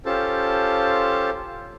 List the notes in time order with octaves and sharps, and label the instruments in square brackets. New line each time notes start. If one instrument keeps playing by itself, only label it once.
[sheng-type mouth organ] C#4 F4 G4 A4 C5 A5